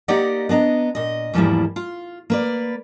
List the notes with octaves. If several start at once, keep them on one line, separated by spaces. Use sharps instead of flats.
A#3 D#4 G4 D5 D#5 F#5
B3 D4 D#5 A#5
A#2 D#5
E2 G#2 F3 G3 A#3 E4
F4
A#3 B4 D5